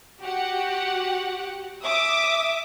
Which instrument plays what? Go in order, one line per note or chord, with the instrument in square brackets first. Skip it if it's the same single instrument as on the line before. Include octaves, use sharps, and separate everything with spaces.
[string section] F#4 G4 F#5
[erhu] E5 [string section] D6 D#6